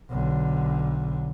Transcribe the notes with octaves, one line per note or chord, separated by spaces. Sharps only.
B1 D3